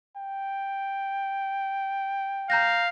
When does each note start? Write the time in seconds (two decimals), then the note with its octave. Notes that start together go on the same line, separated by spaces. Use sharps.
0.17 G5
2.50 F5 A#5 G6 A#6